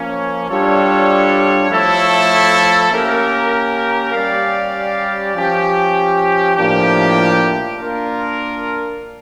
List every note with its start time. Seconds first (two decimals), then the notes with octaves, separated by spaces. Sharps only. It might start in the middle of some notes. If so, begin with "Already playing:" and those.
Already playing: F3 A#3 C#4
0.49 G3 D4 F4 A4 C#5
1.70 F3 A3 E4 A4 C#5
2.91 A#3 C#4 G4 A#4
4.12 G3 C#4 G4 D5 F5
5.35 F3 C#4 G4
6.56 A2 F3 A#3 D4 G4
7.78 A#3 D4 F4 A#4